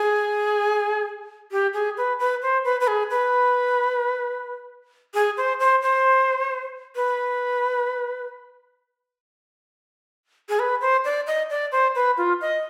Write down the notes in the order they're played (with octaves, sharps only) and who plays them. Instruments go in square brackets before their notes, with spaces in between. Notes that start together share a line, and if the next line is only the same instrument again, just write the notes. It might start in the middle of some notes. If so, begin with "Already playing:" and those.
Already playing: [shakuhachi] G#4
G4
G#4
B4
B4
C5
B4
B4
G#4
B4
G#4
C5
C5
C5
B4
G#4
B4
C5
D5
D#5
D5
C5
B4
F4
D#5